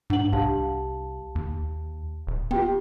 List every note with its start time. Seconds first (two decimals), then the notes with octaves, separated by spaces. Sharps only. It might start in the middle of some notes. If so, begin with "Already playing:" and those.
0.10 G#2 D4 F#5 F#7
0.33 C2 G4 F5 A5
1.35 D#2
2.27 D#1
2.51 B3 F4 G4 G5